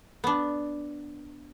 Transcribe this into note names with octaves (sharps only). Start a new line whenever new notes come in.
B3 D4